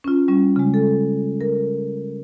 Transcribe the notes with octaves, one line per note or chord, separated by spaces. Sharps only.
C#4 F4
G3 C#4
C#3 G#3
A4
A#4